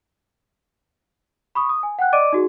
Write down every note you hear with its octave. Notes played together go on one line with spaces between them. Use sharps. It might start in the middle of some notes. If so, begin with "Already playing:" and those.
B5 C#6 D#6
D#6
G#5
F#5 G5 F#6
D5 D#5 D6 D7 D#7
D#4 F#4 G#4